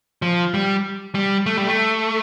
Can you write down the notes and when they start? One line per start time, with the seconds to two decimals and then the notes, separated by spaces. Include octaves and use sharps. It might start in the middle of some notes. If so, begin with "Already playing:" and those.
0.22 F3
0.54 G3
1.15 G3
1.46 A3
1.57 G3
1.67 A3